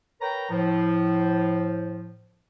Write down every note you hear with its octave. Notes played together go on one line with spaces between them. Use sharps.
A#4 B4 C#5 G5 A#5
A2 F3